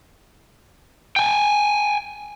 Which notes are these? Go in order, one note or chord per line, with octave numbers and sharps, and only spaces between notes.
G5 G#5